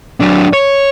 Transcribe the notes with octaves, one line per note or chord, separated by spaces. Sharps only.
F#3 D4
C#5